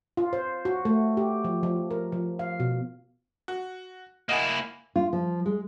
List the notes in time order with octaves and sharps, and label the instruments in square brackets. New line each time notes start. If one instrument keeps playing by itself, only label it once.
[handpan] F4
C5
F#4
A3
G4
F3
F3
A#4
F3
F5
B2
[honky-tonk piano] F#4
[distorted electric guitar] A#3 E4 [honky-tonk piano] D#5 F#5 G#5
[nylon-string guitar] F4
F3
G#3